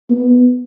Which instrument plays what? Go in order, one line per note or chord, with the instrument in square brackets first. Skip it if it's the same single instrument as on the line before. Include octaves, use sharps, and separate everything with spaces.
[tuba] B3